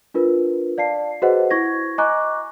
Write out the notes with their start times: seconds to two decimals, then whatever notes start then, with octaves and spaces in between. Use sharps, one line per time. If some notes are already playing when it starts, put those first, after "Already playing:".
0.14 D4 F4 A#4 B4
0.78 D5 F5 A5 C7
1.22 F#4 G#4 B4 C5 D#5 F#5
1.51 E4 C#6 G#6 A#6
1.98 D#5 G#5 A#5 C#6 D6 F#6